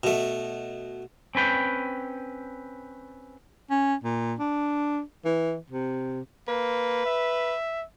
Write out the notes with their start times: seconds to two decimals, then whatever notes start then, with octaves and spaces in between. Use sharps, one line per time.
0.03 B2 A3
1.35 C4 C#4 B4 G5
3.70 C#4
4.04 A#2
4.39 D4
5.25 E3
5.70 C3
6.48 A#3 B4
7.06 E5